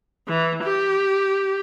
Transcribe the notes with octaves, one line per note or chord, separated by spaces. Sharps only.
E3
G4